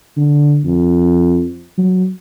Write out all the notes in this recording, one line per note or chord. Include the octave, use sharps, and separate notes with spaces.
D3
F2
F#3